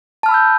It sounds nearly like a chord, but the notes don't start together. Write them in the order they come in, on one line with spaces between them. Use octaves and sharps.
A5 F6 B5 E6 G6